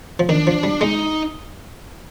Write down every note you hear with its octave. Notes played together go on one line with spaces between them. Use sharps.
F3
D#3 D4
F3
G3
G#3 D#4